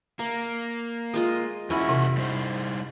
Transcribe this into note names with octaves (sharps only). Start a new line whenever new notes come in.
A#3 A#5
G#3 F4 D#5
E2 C#4 E4 F#4
C3
G3 D#4 C5